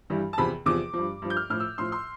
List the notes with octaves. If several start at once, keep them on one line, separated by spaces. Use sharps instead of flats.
G2 E3 G3
A5
E2 C3 F3 B5
E2 C3 F3 D6
G2 F3
G2 F3
G6
F6
A2 F3 F6
E6
A2 F3 C6
C6